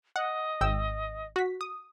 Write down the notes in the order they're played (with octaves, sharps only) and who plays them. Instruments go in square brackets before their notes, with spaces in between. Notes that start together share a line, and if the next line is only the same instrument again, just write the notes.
[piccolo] D#5 [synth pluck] F#5
[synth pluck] G#1 G5 E6
F#4 B6
D#6